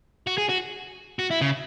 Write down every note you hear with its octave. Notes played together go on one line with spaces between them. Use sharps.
F#4
G#4
F#4
F#4
E4
C#3